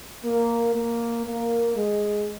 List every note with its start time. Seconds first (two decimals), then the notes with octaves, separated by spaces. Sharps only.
0.24 A#3
0.75 A#3
1.26 A#3
1.76 G#3